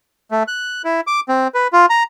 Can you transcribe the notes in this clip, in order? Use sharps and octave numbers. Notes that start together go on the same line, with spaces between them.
A3
F#6
E4
D6
C4
B4
F4
A#5